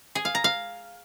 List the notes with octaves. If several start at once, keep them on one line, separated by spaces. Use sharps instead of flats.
G#4
F5
A#5
F5